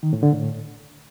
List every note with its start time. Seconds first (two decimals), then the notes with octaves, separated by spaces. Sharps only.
0.03 D#3
0.13 A2
0.23 D3
0.33 A2